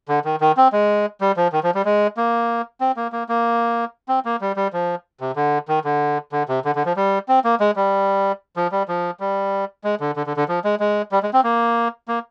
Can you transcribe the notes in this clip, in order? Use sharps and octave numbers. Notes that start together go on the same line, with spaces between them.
D3
D#3
D#3
C4
G#3
G3
F3
D#3
F3
G3
G#3
A#3
C4
A#3
A#3
A#3
C4
A#3
G3
G3
F3
C3
D3
D#3
D3
D3
C3
D3
D3
F3
G3
C4
A#3
G#3
G3
F3
G3
F3
G3
G#3
D3
D3
D3
D3
F3
G#3
G#3
G3
G#3
C4
A#3
A#3